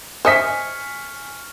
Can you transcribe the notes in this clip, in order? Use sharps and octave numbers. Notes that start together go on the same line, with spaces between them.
C5 D#5 E5 G#5 C#6 F6 B6 C#7